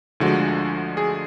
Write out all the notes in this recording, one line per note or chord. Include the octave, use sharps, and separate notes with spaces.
D2 D3 F3 G#3 F#4
G#4